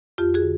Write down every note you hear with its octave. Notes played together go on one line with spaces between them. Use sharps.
F2 F4 G4
F#4 G#4
D3